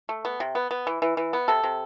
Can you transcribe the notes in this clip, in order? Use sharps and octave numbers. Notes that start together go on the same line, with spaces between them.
A3
B3
C3
B3
B3
E3
E3
E3
B3
C3 A4
C3